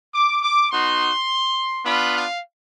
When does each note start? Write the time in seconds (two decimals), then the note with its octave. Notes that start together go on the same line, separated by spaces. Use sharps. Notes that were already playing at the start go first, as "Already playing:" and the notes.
0.14 D6
0.43 D6
0.71 B3 D#4 F#4 C6
1.85 B3 D4 F4 B5
2.13 F5